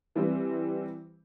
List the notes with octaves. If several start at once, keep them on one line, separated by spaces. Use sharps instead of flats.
E3 G3 C4